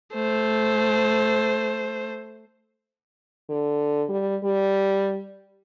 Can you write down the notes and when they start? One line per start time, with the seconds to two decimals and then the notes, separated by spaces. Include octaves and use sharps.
0.14 A3 C5
3.49 D3
4.09 G3
4.43 G3